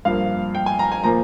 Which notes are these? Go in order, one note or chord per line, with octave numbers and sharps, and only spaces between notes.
G2 F3 A#3 F5
G5
G#5
A#5
G#5
A#2 F3 A#3 A#5